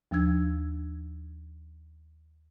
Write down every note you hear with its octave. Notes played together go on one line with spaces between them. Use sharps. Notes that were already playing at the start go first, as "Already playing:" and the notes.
D#2 F3 D4 E6 G#6